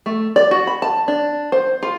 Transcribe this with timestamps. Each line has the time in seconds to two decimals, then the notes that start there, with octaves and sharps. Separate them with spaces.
0.06 A3
0.36 D5
0.51 F#4
0.67 B5
0.82 A5
1.08 D4
1.52 C5
1.83 F4